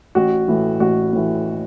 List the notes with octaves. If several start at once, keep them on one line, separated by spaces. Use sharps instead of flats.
A1 F#4
A2 E3
A1 F#4
A2 E3